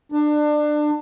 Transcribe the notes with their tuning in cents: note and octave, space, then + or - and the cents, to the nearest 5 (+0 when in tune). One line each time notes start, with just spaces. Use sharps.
D4 +25